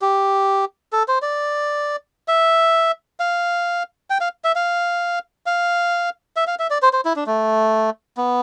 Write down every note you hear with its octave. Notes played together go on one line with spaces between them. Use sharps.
G4
A4
C5
D5
E5
F5
G5
F5
E5
F5
F5
E5
F5
E5
D5
C5
C5
E4
D4
A3
B3